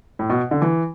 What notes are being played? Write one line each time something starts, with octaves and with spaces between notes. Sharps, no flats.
A2
B2
D3
E3